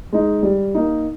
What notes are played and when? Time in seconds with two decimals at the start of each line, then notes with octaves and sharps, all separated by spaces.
0.13 G#3 D#4
0.43 G3
0.74 A#3 D#4